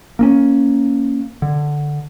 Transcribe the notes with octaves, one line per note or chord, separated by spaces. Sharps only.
A#3 C4 C#4
D3